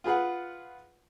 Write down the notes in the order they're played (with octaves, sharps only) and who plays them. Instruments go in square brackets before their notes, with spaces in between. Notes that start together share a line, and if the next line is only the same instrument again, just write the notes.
[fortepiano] F4 G#4 B4 F#5